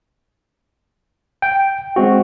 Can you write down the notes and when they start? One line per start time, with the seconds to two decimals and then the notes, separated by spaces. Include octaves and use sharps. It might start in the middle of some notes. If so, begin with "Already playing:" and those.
1.42 G5
1.96 G#3 C4 F#4